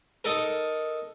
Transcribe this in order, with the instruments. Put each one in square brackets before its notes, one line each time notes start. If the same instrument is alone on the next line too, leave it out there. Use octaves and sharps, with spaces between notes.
[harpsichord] D#4 A4 A#4